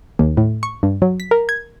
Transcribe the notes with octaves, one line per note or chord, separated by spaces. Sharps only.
D#2
A2
C#6
G2
F#3
B6
A#4
G#6